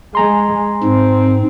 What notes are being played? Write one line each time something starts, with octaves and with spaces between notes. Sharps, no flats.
G#3 G#5 A#5 C6
G#2 C4